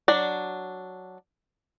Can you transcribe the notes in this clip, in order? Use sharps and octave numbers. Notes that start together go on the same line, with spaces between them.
F#3 D4 D5